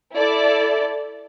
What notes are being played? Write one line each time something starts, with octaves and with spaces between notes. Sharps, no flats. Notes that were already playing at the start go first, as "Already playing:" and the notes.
E4 A4 D5